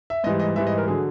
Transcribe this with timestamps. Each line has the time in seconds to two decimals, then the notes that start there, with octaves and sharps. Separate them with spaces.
0.10 E5
0.24 G#2 E3 G3 D#5
0.40 D#5
0.56 G#2 E3 G3 E5
0.67 D#5
0.78 A#4
0.88 D3 F#3 G#4